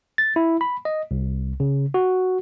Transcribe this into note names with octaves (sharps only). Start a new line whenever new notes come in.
A6
E4
B5
D#5
C2
C#3
F#4